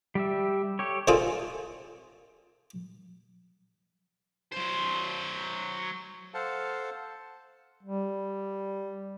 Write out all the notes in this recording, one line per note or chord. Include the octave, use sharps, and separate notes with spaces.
G3 G4 E5
G4 A4 C#5
D3 D#3 C4 F4 G#4 A4
F#3 C5
A4 C5 F5 F#5 A5
G3